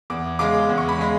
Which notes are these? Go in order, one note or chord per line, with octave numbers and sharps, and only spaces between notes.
E2 D6
C#3 G#3 D6
E2
C#6
B5
C#3 G#3